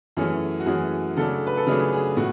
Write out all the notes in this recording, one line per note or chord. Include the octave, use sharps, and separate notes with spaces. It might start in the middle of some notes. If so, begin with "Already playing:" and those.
F#2 E3 A3 C#4 G#4
F#4
F#2 E3 A3 C#4 G#4
C#3 F#3 A3 D4 A4
B4
A4
C#3 F#3 A3 D4 G#4
G#4
A2 F#4